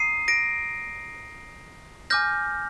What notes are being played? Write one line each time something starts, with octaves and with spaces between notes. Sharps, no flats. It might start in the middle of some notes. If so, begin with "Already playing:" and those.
Already playing: A#5 D#6 C7 D#7
A#6 D7
G#5 D6 F6 G6 A#6